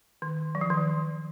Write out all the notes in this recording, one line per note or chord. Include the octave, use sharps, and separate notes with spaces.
D#3
F#3
F3
D#3
F3